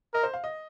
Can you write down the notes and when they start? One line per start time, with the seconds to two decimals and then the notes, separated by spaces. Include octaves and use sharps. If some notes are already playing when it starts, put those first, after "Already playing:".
0.14 A#4 D#5
0.23 C5
0.34 F5
0.44 D#5